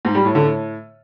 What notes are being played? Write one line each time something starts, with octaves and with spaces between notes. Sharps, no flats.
G#2
G3
A2
D3
A2